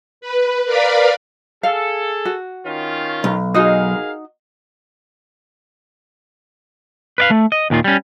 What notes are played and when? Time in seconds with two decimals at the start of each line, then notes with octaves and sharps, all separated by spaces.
0.21 B4
0.65 A#4 B4 D5 F5 B5
1.63 G#4 A4 F5
2.25 F#4
2.66 D#3 C#4 F4
3.24 B1
3.54 D#4 F#4 G#4 A#4 D#5 F5
7.18 B4 D5 F5
7.31 A3
7.52 D#5
7.70 D#2 A#2 D#3 F4
7.84 G3 C#4